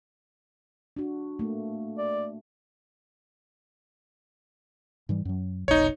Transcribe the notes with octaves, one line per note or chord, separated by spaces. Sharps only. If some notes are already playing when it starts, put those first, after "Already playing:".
D4 F#4
A3 A#3
D5
G#2 E3 G3
F#2 F#3
F1 B1 D#4 C#5